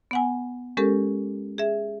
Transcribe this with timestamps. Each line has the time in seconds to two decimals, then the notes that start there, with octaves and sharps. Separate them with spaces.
0.11 B3 F#5 G#5
0.77 G#3 C#4 G4 A4 A#4
1.58 G#4 E5